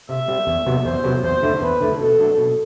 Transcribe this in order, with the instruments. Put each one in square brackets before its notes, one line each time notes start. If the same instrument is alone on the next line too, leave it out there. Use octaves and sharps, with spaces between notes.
[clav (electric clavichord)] C3 [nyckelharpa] E5
[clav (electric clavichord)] G3 C4
E2
C3 F#3 B3
[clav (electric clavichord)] E2 [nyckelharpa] C5
[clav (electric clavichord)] C3 F#3 B3
[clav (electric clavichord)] E2 [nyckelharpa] C5
[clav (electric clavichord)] D3 A3 E4
[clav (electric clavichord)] E2 [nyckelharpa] B4
[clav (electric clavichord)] D3 A3 E4
[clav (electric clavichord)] B2 [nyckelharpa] A4
[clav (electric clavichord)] F#3 A3 D4
B2